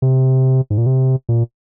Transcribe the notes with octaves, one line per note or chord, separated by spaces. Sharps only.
C3
G#2
A#2
C3
A#2